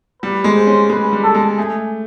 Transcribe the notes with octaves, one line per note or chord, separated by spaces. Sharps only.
G3 B4
G#3
C5
C#4
G#3 B4
G3
A4
G#3
A3 G#4